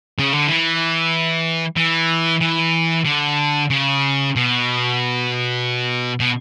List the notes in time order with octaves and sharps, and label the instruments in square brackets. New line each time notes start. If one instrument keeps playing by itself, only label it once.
[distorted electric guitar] C#3
D3
E3
E3
E3
D3
C#3
B2
B2